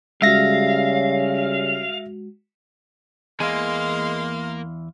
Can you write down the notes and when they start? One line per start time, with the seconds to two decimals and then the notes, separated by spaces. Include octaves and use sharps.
0.22 C#3 G3 G#3 C#4 F#4 E5 F5 A#6
3.40 E2 E3 G#3 A#3 F5 G#5 C6